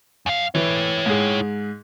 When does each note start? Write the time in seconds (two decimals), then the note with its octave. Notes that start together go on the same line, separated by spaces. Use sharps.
0.26 F#2 F5
0.55 E3 E4 C#5
1.06 G#2 G#4